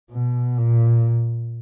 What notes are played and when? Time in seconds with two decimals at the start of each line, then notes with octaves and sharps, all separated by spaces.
0.11 B2
0.58 A#2